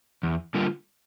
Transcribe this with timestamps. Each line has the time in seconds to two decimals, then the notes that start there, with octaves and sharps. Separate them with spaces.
0.23 E2
0.54 D3 G3 A#3 F4